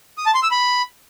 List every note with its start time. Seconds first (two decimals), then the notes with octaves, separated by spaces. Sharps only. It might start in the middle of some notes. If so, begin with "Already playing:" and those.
0.18 D#6
0.26 A5
0.34 C6
0.43 E6
0.51 B5